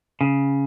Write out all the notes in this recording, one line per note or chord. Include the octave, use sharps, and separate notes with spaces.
C#3